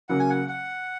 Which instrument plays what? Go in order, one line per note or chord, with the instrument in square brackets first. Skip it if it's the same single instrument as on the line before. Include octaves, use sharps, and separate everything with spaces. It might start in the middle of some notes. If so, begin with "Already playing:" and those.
[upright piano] C#3 F#3 A#3 [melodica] F#5
[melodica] G#5
F#5
F#5